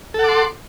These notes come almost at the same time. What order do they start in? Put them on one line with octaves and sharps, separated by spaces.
A4 F#5 D6 C6